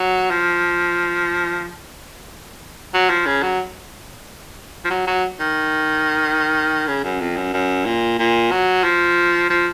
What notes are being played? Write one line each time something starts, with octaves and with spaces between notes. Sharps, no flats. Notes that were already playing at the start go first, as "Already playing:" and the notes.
Already playing: F#3
F3
F#3
F3
C#3
F#3
F3
F#3
F#3
D#3
C#3
F#2
F2
F#2
F#2
A#2
A#2
F#3
F3
F3